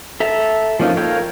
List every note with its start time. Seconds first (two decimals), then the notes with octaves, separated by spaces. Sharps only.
0.20 A4 E5 A#5
0.80 F3 A#3 C#4 D#4 F4
0.97 A4 A#4 C#5 F5 G5